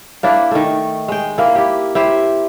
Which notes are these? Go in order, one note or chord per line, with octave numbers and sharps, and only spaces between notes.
A#3 D4 E4
D#3 A3
G#3 G5
A#3 E4
E4 G4
E4 G4 C5